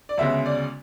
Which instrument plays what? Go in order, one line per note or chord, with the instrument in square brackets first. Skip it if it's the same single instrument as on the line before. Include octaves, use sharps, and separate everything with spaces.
[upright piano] D5
D2 C#3 G#3 B3 E5
D5